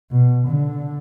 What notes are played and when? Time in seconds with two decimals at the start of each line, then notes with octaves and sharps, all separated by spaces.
0.11 B2
0.47 D3